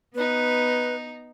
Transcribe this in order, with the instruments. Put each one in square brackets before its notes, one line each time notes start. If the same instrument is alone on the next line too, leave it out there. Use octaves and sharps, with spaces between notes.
[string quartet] B3 D#4 [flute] B4